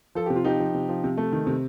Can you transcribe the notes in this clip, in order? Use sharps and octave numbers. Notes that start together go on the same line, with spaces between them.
F3 A4
C3 G4
F4
F3 D#4 G4
F3
C3
F3
C3
A3
D#3
C3